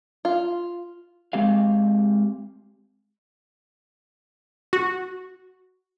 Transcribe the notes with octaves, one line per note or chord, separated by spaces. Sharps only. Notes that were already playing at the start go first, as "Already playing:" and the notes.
F4
G#3 C4 G4 F5
F#4